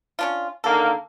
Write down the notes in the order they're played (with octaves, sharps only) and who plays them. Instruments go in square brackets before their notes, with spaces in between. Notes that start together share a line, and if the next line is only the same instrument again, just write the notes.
[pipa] C#4 D4 F4
[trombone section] D3 D#3 A#3 [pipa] A4